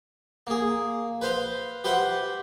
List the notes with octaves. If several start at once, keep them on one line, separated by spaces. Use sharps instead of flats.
A#3 G#4
B4 C5 F5
G4 B4 C5 E5 F#5